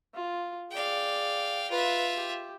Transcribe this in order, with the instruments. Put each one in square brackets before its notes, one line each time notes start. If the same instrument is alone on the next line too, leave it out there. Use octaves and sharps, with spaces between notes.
[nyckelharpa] F4
[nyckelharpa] G#4 D5 [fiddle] F5 G5
[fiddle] F4 E5 [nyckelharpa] B4
[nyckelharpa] G4